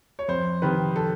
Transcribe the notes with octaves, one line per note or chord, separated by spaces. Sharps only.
C#5
F2 C5
C3 D#3 B4
A4